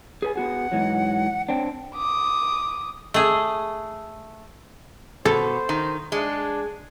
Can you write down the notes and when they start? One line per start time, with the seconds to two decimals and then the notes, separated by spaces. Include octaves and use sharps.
0.22 G#4 B4 G#5
0.36 B3 F#4 G#4 F#5
0.72 G#2 E3 F#3
1.49 C4 D4 G5
1.95 D6 D#6
3.14 A3 G#4
5.25 B2 A4 C5
5.69 D#3
6.12 G#3 D4